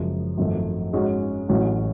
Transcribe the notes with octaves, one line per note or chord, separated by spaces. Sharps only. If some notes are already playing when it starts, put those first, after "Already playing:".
Already playing: F#1 F#2 F3 G#3
G#1 F#2 F3 A3
G#2 G#3 C#4 F#4
A1 A2 F#3 C#4 F#4